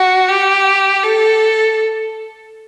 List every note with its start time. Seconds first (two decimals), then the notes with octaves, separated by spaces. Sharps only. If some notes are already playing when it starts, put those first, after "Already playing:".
Already playing: F#4
0.28 G4
1.04 A4